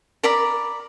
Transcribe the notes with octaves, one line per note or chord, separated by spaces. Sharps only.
A#4 D5 B5